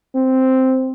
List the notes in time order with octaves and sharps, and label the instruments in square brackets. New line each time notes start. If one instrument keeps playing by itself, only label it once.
[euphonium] C4